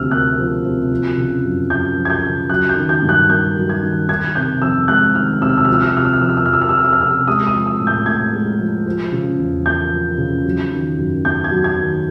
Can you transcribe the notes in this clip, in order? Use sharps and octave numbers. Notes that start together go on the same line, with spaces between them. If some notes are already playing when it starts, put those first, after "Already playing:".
Already playing: D2 C3 F3 E6 F6
A#3 F#6
F3
C3
F3
C#3
F#2
F#2 G6
F3
G#6
G6
C#3
F#3 F#6
G6
D#3
G6
G2
F#6
A#3 G6
F#3
G#6
D#3
D#3 G#6
C3 G6
F2 E6
G#3 F#6
D#3 F6
C3 E6
F6
E6
F3 F6
E6
F6
E6
C3 F6
E6
F6
F2 E6
F6
E6
F2 F6
E6
F6
E6
F3 F6
E6
F6
C3 E6
G#3 D#6
D#6
F3
E6
A2
G6
A2 G#6
G#3
F3
F3
C#3
E2
A#3 G6
F3
C#3
F#3
D#3
F#2
B3 G6
G#6
F#3
G#6
D#3